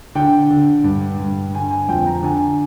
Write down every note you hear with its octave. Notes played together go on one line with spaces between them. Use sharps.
D3 G5
D3
G2
G2
D3 G#5
G#5
F2 G5
A#5
D3 G#5